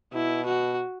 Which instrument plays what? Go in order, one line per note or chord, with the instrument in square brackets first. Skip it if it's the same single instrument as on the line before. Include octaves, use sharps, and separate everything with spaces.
[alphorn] B2 [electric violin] E4
[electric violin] F#4